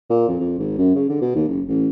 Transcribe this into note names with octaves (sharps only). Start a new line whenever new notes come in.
A#2
F2
F2
G#1
F#2
C#3
D3
B2
D#2
F#1
A1